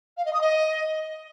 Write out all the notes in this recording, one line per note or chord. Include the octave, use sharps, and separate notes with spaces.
F5
D#5
D#6
D#5